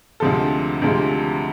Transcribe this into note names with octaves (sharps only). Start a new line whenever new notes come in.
D2 C3 F3 G#3 A4
D2 C3 F3 G#3